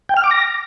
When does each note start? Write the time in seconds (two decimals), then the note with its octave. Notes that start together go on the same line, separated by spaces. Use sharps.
0.09 G5
0.17 F6
0.24 D6
0.31 A#6